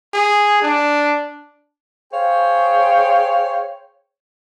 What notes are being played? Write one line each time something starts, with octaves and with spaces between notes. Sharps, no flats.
G#4
D4
G#4 C5 C#5 F5 G5